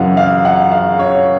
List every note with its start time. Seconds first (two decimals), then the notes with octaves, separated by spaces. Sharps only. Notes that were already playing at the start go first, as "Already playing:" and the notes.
Already playing: F#2 C#3 E3 F5 F#5
0.17 F5
0.45 F#5
0.72 F5
0.99 C#5